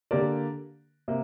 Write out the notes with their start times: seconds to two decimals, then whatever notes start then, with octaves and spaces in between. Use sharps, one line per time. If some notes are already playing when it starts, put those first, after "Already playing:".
0.11 D3 A#3 G4 A#4 D5
1.08 C3 A#3